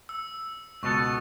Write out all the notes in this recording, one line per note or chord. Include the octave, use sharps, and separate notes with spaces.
E6
C#2 B2 B3 A4 C#6